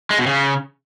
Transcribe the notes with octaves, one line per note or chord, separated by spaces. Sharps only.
G#3
B2
C#3